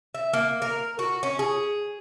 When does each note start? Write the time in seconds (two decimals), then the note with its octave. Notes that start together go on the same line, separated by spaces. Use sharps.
0.15 E5
0.33 A#3
0.62 A#4
0.99 F#4
1.23 C#4
1.39 G#4